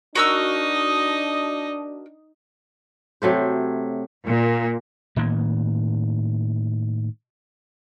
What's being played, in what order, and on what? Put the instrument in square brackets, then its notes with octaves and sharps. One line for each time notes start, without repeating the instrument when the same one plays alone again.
[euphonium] D4 [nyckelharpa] D#4 D#5 [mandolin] F#4 A#4 E6
[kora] C3 F#3 A3 C5
[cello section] A#2
[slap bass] A2 D#3 A#3 B3